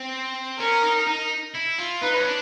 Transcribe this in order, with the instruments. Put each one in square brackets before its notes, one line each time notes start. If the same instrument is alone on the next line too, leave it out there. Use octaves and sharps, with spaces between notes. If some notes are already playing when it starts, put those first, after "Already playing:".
Already playing: [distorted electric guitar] C4
[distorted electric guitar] C#4 [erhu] A#4
[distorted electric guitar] D#4
D#4
E4
F4
[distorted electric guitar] D#4 [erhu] B4
[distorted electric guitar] C#4
D4